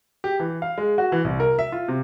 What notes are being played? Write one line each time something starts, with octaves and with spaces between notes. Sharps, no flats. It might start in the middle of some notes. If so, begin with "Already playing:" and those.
G4
E3
F5
G#3
F#4
E3
C2
A#4
E5
F4
C3